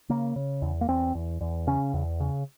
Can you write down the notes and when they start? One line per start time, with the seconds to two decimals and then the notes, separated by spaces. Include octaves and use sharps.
0.09 C#3 A#3
0.36 C#3
0.62 E2
0.81 A#3
0.88 E2 C4
1.15 E2
1.41 E2
1.67 C#3 C#4
1.94 E2
2.20 C#3